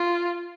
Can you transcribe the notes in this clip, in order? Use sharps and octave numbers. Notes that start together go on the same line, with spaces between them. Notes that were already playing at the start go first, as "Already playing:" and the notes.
Already playing: F4